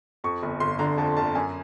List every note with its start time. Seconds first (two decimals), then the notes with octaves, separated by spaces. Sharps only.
0.24 F2 C#6
0.43 G1
0.60 G1 C6
0.79 D3 A#5
0.98 F2 A5
1.17 G1 A5
1.35 F#2 G#5